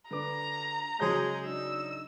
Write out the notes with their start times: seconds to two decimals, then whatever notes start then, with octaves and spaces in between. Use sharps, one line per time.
0.11 D3 B4 A#5 D6
1.00 C#3 F#3 G#3 G#4 C#5 A5 G6
1.46 D4 D#4 E6